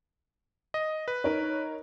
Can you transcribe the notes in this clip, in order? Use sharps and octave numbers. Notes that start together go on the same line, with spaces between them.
D#5
B4
D#4 A#4 C#5